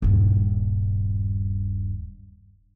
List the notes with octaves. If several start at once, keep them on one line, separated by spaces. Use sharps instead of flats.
D#1 G2